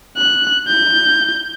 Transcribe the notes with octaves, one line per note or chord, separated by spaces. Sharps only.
F#6
G6